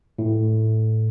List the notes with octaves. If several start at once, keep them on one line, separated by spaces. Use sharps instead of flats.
A2